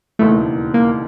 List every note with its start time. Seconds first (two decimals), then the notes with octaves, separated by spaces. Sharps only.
0.19 E1 D#2 C#3 E3 A3
0.74 A#3